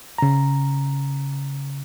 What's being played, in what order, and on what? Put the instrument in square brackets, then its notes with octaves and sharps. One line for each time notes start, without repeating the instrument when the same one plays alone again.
[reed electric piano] C#3 A#5